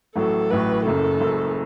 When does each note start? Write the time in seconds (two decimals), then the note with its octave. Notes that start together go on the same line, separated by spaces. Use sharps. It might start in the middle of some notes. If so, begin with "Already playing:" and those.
0.15 A1 A2 F#3 A4
0.50 A1 A2 F#3 B4
0.85 F#1 F#2 C#3 A4
1.20 F#1 F#2 C#3